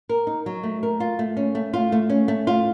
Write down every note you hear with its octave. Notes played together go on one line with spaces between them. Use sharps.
A#4
D#4
F#3
A3
A#4
F4
A3
C#4
A3
F4
A3
C#4
A3
F4